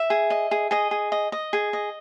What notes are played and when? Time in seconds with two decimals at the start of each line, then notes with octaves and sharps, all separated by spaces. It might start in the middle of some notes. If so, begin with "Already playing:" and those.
Already playing: E5
0.10 G#4
0.30 D#5
0.51 G#4
0.71 G#4 D#5
0.91 G#4
1.12 D#5
1.32 D#5
1.53 G#4
1.73 D#5